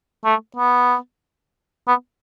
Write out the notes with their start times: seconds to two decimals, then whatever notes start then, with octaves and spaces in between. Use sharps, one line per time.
0.25 A3
0.56 B3
1.88 B3